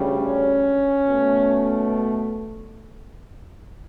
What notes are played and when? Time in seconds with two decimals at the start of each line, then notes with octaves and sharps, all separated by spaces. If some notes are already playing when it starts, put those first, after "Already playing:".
Already playing: D2 C#3 G3
0.17 C#4
1.06 B2 A3